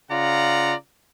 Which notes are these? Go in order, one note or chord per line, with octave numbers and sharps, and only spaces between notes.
C#3 F4 D5 F#5 A#5